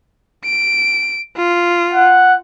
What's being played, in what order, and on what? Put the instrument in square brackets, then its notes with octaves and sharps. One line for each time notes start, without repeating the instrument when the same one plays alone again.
[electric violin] D7
F4
[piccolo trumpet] F#5